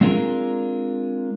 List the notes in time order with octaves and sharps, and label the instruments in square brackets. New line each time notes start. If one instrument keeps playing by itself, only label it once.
[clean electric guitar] G#3 C4 D4 F4 G#4 A#4